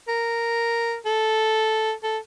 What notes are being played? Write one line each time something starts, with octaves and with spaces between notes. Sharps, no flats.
A#4
A4
A4